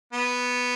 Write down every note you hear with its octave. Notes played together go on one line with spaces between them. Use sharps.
B3